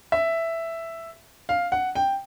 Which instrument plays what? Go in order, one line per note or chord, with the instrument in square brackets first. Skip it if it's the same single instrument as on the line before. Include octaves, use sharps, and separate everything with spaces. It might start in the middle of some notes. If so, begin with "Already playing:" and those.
[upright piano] E5
F5
F#5
G5